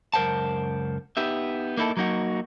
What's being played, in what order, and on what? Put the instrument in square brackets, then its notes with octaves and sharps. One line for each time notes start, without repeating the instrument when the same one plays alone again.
[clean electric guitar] C#2 F#2 A#4 C5 F#5 A5
B3 D#4 G4 E5
A#3 D#4 E4 A4
F#3 A#3 D#4 F#4